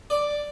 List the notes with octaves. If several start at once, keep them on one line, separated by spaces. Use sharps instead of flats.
D5